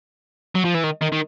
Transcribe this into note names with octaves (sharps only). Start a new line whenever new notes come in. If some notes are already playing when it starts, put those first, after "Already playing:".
F#3
F3
E3
D#3
D#3
D#3